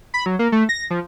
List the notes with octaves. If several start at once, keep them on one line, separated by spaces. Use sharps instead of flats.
B5
F#3
A#3
A3
A#6
F3